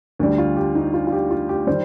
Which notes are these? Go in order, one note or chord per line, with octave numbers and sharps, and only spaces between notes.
D2 D3 G3
F4
G4
D#4
F4
F4
G4
F4
G4
D#3 G3 C5